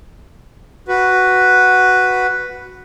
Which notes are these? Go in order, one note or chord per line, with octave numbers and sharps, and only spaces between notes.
F#4 B4